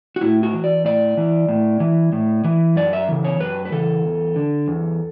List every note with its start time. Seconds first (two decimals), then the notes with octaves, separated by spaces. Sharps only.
0.16 F#4
0.21 A2 E4
0.43 F#4
0.54 E3
0.64 D5
0.85 A2 D5
1.17 E3
1.48 A2
1.80 E3
2.13 A2
2.44 E3
2.76 F#2 D5
2.93 E5
3.09 C#3 E3
3.24 C#5
3.39 F#2 B4
3.65 B4
3.72 C#3 E3 A4
4.05 E2
4.36 D3
4.68 E2